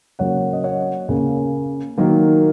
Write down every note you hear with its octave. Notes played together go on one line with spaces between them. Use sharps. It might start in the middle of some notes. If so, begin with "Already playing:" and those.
C#3 F#3 A#3 C#5 F#5
D#5
C#5 F#5
C#3 A#3
D#3 F#3 A#3